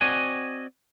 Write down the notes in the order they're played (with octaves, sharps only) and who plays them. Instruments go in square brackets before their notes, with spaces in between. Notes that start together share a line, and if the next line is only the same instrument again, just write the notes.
[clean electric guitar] C4 F#4 D5 D#5 F#5 G#5